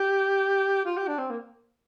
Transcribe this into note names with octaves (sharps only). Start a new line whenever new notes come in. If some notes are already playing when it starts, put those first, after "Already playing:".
Already playing: G4
F4
G4
D4
C4
A#3